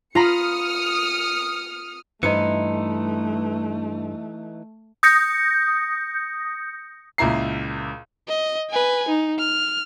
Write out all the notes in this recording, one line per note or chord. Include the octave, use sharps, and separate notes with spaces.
F4 A#5 B5 D#6 F6 C#7
G2 E3 A3 D#4 B4 C5 D#5 C#7
D#6 G6 A#6 C#7
C#2 A#2 E4 A#5 C7
D#5
B4 G#5
D#4
F6